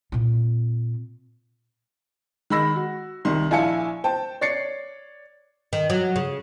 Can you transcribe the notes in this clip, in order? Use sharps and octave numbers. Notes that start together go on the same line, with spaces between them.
A#2 C4
D#3 G#3 B5 E6 A#6
F#4
C2 D#3 C6
A#1 E4 F5 G#5 A5 C#7
C5 G5 A5
C#5 D5 A6 C7 C#7
D#3
F#3
C#3